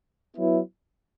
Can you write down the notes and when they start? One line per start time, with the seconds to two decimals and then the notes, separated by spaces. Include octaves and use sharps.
0.37 F#3 B3 E4